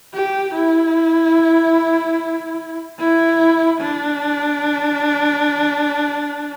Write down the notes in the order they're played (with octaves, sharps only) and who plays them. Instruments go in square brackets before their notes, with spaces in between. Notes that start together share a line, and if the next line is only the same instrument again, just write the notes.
[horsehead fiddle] G4
E4
E4
D4